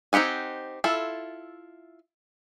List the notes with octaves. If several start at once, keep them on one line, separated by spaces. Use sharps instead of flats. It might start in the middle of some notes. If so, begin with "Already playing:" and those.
C4 D#4 G4 F#5 G#5
E4 F4 A4